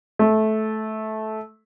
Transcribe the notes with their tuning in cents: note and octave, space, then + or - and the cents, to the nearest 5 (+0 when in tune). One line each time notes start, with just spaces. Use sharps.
A3 -15